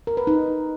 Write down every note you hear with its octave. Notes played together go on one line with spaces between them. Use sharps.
A#4
B4
D#4